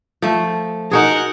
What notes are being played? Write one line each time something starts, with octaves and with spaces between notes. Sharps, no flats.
F3 A3 E5
D#4 F#4 G#4 A#4 F#5